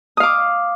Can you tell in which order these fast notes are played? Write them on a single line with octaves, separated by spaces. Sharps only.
D#6 F5 D6